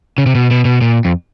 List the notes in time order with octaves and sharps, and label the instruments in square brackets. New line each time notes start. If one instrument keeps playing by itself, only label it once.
[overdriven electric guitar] C#3
C3
B2
B2
B2
A#2
F2